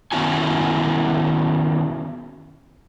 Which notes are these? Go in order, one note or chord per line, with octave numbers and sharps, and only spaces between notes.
D#3 B3 C#4 E4 F#4 G#5